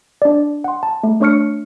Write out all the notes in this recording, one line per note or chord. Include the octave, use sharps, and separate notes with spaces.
D4 D5
F#5 C6
A5
A3
A3 D4 C#5 C#6 F6 C#7